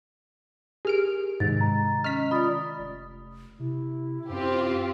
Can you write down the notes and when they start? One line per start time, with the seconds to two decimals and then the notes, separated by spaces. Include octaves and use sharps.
0.85 G4 G#4 A#4 F6 D7
1.40 G#2 C3 D#3 G#3 A6
1.61 A#5
2.04 C#4 D#5 F6 B6
2.31 F4 D5 B5 D#6 A6
2.79 F1
3.59 C3 E4
4.29 F#2 C4 F4 G4